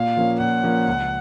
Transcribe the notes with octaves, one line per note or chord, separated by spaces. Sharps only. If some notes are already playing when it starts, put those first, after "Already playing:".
Already playing: A#2 F5
F3 A#3 C#4
A#2 F#5
F3 A#3 C#4
C#2